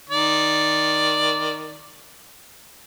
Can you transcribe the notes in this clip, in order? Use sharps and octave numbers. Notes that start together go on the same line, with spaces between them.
D#3 D5